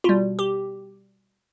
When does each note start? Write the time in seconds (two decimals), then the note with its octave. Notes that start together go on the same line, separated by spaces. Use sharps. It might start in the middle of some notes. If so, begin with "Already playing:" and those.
0.04 B2 G3 F4
0.39 G4